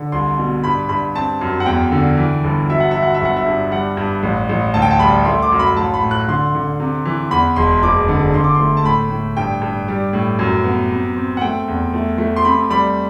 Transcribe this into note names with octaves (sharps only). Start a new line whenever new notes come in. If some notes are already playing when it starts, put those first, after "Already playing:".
Already playing: D3
C2 C6
B2
G2 B5
G2 B5
C4 A5
F#2
F#5
E2 G5
D3
E3
G1
F#3 E5
F#5
F#3 E5
F#5
E5
G1 F#5
E5
G2
G3 F#5
G2
A1
A1
D2 A5
G5
A5
G3 B5
A3 C6
D6
F#2
B5
A1 A5
B5
A2
F#6
D3 C6
D3
C3
E3
E2 B5
E1 C6
F#1 D6
D3
D3 C6
D6
A3 C6
A5
A2 B5
A2
G2 G5
G2
G3
A2
F#2
B3
C3
C4
F#5
A3 G5
E2
A3
A3
C6
C3 B5
G3 B5